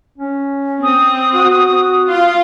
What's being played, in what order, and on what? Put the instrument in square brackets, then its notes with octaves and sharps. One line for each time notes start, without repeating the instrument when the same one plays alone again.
[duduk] C#4
[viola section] C4 [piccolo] D#6
[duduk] F#4
[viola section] F4 F5 C6